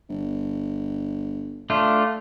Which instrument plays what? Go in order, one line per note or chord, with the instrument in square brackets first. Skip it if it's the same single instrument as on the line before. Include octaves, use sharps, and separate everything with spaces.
[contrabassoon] G1
[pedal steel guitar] A3 D4 F4